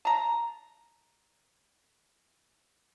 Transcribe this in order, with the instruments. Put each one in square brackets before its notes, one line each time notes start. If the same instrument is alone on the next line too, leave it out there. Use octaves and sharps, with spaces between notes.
[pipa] A5 A#5